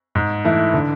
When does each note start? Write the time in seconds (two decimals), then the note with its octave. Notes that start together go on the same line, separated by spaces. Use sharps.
0.15 G#2
0.45 E3 A3 E4
0.74 D3